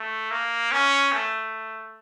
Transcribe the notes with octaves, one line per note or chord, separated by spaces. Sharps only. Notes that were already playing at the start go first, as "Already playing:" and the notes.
Already playing: A3
A#3
C#4
A3